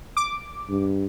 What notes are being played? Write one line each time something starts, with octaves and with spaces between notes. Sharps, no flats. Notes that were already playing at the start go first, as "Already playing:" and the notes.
D6
G2